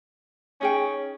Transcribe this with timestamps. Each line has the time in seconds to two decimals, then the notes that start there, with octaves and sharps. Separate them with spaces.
0.61 C#4 D#4 G#4 G5